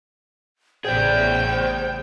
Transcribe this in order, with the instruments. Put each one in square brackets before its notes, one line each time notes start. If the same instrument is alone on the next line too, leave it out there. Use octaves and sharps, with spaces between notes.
[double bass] A1 C#3 [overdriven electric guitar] G#4 D5 [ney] C5 [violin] G5